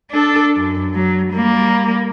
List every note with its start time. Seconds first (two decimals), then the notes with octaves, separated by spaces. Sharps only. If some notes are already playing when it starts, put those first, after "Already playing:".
0.11 D4 A4
0.57 F#2
0.95 F#3
1.33 G3 A#3